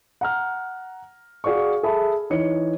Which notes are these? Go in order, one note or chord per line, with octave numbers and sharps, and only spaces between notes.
F#5 A#5 F6
F#4 G#4 D5 F5 C#6
G#4 A4 E5 A5 B5
E3 D#4 C#5 C#7